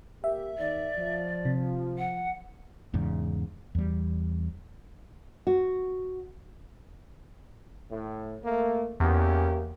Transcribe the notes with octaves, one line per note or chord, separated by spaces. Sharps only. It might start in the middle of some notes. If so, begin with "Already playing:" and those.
A#3 G4 E5
D#2 D#3 D5
F3
C3
F#5
E2 G#2 C#3
E2 G3
F#4
A2
A3 A#3
E2 A#3 C#4 G4